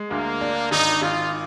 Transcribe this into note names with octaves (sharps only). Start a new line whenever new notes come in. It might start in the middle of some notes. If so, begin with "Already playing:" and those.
Already playing: G#3
D2 A#3
D4
G#1 D#4
G#1 F4